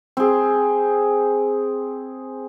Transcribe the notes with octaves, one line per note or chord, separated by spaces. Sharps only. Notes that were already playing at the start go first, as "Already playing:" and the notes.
C4 G#4